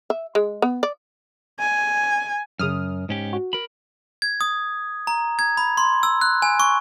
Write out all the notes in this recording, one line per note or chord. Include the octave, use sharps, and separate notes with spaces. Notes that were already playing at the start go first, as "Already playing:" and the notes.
E5
G#3
B3
D5
G#5
F#2 C#3 D#6 F6
G#2 C#4 G4
F#4
A#4 B5
G#6
D#6
A#5
G#6
B5
C6
E6
F#6
G#5
C#6